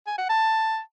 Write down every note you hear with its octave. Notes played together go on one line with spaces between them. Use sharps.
G#5
F#5
A5